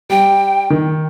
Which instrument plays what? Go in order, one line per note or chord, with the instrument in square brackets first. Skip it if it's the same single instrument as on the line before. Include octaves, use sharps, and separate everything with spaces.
[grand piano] G3 [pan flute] G5
[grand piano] D#3